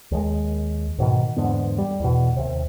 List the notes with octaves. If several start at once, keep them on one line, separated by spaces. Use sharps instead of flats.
D#2 G#3
G#2 B2 D#3
E2 G#2 D3 B3
G3
E2 B2
D#2 C3